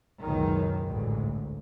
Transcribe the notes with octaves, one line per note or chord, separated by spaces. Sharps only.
F#1 C#2 F#2 B2 D#3
A1 D2 G#2